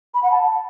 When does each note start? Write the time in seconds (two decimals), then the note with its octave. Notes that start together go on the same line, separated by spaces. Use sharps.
0.14 B5
0.23 F#5
0.31 A5